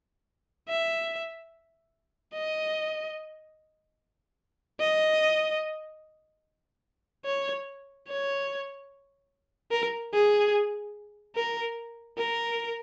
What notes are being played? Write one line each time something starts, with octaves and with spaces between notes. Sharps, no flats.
E5
D#5
D#5
C#5
C#5
A#4
G#4
A#4
A#4